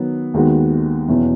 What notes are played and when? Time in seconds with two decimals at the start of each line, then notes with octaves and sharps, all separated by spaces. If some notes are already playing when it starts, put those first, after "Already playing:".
Already playing: D#3 F#3 B3
0.34 D#2 D#3 G#3 B3 F#4
1.08 E2 B2 F#3 C#4 E4